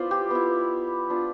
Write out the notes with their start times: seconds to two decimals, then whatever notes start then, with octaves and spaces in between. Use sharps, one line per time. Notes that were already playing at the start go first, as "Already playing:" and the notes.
Already playing: B3 E4 F4 C5 D5
0.11 G4
0.30 B3 E4
1.10 B3 D4 F4